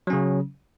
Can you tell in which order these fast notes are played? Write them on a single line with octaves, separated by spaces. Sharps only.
F#3 C#4 C#3